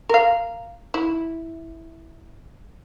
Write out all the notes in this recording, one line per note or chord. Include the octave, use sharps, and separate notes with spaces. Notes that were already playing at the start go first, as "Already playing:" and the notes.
A#4 F5
E4